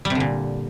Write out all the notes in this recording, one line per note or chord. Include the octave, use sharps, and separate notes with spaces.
G3
C3
D3
A#2